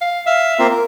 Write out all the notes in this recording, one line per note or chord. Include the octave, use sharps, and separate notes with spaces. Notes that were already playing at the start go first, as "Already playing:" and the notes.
F5
E5 F5
A#3 C4 F4
A#4